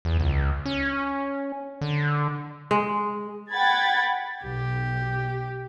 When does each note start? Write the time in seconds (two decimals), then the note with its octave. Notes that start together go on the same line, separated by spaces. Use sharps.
0.05 E2
0.20 C#2
0.66 C#4
1.81 D3
2.71 G#3
3.53 F#5 G5 B5 G#6 A6
4.44 B1 G4